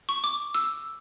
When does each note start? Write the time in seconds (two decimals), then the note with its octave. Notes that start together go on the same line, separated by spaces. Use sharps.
0.09 C#6
0.24 D6
0.55 E6